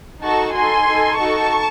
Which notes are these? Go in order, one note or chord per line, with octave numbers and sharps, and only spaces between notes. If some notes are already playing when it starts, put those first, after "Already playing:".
D#4 F#4 A4 A5 C#6
D#4 F#4 A4 G#5 C6
D#4 A4
D#4 F#4 A4 A5 C#6